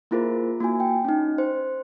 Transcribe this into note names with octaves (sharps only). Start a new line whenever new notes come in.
A#3 E4 F4 G#4 A#4 C5
A#3 E4 F#4 G#5
G5
C#4 D#4
C5